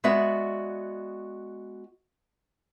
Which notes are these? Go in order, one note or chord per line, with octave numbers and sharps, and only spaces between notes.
G#3 B3 F#4 D5 E5